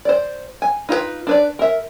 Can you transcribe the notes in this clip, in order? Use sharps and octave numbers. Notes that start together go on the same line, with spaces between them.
C5 D5
G#5
D#4 F4 F#4 B4
D4 B4 D5
A#4 E5